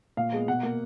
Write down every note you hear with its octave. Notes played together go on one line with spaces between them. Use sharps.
A#2 F5
G#3 B3
B2 F#5
A#3